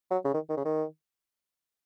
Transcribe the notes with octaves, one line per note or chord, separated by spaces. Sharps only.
F#3
C#3
D#3
D#3
C#3
D#3